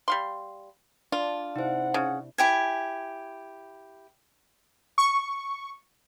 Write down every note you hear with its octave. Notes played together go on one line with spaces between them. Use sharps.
G3 F5 C6
D4 F4
C3 D#4 E4 C5 F#5
C#3
E4 G4 G#5
C#6